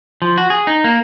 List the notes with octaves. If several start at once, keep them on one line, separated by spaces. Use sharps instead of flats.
F3
F#4
G#4
D#4
A#3